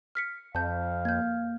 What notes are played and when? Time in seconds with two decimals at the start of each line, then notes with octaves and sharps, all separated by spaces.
0.15 F6 B6 C#7
0.55 F2 F5 A5 G6
1.05 A#3 G6 G#6